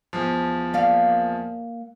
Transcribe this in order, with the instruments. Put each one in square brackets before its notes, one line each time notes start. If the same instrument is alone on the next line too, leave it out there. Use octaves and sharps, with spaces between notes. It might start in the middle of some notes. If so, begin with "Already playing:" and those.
[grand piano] E2 F3
[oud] A#3 D5 F5